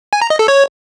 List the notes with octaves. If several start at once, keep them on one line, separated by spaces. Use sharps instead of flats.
G#5
A#5
D#5
A4
C#5